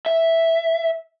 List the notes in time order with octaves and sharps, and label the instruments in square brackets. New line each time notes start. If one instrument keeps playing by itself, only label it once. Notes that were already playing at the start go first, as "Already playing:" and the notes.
[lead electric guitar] E5